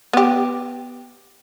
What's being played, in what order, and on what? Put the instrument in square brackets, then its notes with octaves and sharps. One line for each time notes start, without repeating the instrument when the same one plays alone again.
[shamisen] B3 G4